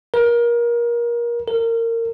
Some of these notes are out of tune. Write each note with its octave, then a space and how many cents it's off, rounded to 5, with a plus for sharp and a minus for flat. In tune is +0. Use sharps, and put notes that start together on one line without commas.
A#4 +25
A#4 -25